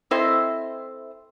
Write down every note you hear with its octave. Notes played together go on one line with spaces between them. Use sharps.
C4 E4 A4 C5 D#5 E5